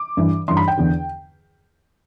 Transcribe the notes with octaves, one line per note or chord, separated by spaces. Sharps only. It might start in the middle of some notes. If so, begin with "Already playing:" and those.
Already playing: D6
G2 E3
G2 E3 C6
B5
G5
E2 D3